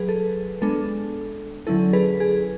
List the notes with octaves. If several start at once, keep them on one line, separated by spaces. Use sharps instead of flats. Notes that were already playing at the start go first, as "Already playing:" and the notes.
Already playing: F#3 G#4 B4
A4
G#3 B3 D4 A4
D3 F#3 C#4 E4 A4
G#4 B4
G#4